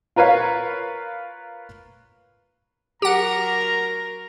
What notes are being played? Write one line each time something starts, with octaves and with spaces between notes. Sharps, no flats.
F4 A#4 B4 C#5 F5
F#3 G4 A#4 F#5 A#5